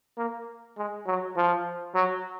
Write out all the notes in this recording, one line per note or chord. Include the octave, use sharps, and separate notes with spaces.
A#3
G#3
F#3
F3
F#3